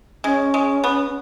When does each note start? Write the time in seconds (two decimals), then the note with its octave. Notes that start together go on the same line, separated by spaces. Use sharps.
0.24 G#3 C#4
0.54 G#3
0.84 B3